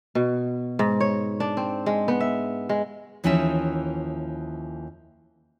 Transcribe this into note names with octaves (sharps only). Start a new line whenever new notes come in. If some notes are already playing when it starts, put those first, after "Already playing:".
B2
G#2
C#5
D4
C4
G#3
B3
E5
G#3
D#2 E3 F3 C#4 D#4 E5